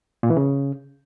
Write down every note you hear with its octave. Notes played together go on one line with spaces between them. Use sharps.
A#2
E3
C#3